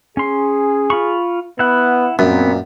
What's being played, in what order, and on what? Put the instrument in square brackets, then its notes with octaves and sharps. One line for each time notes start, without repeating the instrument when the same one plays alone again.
[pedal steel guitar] C#4 C6 [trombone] G#4
[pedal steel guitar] F4 B5 C#6
[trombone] B3 [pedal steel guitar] E4 F#5
[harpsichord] F#2 [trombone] A#2 [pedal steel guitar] B3 C4